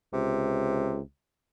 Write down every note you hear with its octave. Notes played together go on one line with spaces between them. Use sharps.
C#2 C3